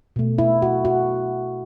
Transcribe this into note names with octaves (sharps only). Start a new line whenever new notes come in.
B2 A3
E4
F#4
F#4